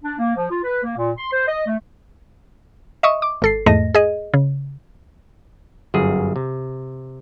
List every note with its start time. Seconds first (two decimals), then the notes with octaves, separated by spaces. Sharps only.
0.04 D4
0.19 A#3
0.36 F3
0.50 F4
0.63 B4
0.83 A#3
0.97 A#2
1.18 C6
1.32 C5
1.47 D#5
1.67 A3
3.03 D#5 E5 C#6 D#6
3.22 D6
3.42 G#1 A4 C7
3.66 E2 G#2 A3 D#5 A#6
3.94 G#4 D#5
4.34 C#3
5.94 G1 F#2 G#4
6.36 C3